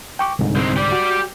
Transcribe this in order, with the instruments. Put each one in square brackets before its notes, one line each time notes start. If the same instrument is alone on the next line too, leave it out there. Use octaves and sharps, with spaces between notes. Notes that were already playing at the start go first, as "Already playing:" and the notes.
[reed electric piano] G5 C#6 D6
C2 G#2 D3
[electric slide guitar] G#3 C4
G4 D5
[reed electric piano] F#4